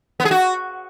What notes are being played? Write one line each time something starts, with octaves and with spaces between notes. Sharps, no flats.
B3
G#4
F#4